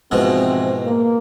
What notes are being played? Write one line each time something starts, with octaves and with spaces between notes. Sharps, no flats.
G#2 B2 E3 F3 G#3 C4
A#3